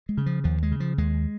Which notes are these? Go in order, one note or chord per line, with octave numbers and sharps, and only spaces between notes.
G#3
C#3
F3
D#2 F3
G#3
C#3
F3
D#2 G#3